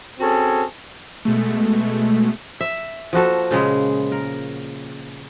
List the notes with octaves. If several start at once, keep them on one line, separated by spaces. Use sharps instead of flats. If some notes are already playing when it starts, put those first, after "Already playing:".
C4 C#4 F#4 G#4 A4
B2 G#3 A3
E5
F3 A#3 F#4 A4
A#2 C#3 G#3
A#4